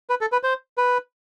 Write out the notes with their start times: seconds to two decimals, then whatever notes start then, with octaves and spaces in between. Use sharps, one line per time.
0.10 B4
0.21 A4
0.32 B4
0.43 C5
0.78 B4